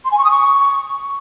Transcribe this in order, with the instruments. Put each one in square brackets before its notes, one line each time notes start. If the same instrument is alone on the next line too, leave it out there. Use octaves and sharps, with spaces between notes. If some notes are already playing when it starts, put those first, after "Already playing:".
[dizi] C6
G#5
C#6
D#6
C#6